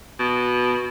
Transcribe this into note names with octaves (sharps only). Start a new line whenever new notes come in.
B2